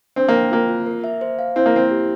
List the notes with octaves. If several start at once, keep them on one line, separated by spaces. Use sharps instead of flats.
C4 D4
A#3
G5
A#3 F4
F4
A#4
E5
C5
F5
C4 E4
A#3
C4 E4
G4